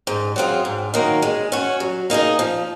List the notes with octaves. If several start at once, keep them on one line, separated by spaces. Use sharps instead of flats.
G#2
F#3 C4 F4 G#4
G#2
D#3 F#3 A#3 D#4
G#3
C#4 F#4 C#5
F#3
A#3 D#4 G#4 D#5
F3